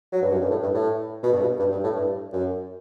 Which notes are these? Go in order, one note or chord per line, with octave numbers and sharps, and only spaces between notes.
F#3
G2
F#2
G2
A2
G2
A2
B2
G2
B2
G2
G2
A2
G2
F#2